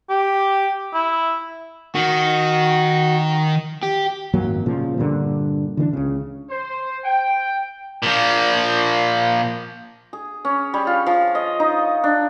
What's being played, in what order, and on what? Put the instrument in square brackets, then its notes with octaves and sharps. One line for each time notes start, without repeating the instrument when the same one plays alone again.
[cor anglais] G4
E4
[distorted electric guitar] D#3 [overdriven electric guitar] F#4
[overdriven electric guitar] G4
[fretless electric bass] G#1 F#2 F#3 A#3
A#2 C#3 F3
G2 A#2 D3
D3 E3 G#3 D4
C#2 C#3
[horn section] C5
G5
[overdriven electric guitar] A#2 F3
[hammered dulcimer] G#4
C#4
G3
F4
F3
D#5
D#4
D4